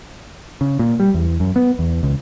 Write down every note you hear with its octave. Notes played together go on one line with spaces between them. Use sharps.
C#3
A#2
G3
E2
F#2
B3
E2
C#2